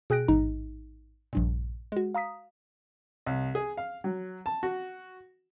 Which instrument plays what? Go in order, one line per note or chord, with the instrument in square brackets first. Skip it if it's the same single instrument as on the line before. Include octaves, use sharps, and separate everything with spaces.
[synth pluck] B2 G#4 G5 F#6 A#6 D7
A1 G#2 D#4
A#1 G2 A#2
G#3 F#4
F5 A#5 D#6 B6
[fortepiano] C2
G#4
F5
F#3
A5
F#4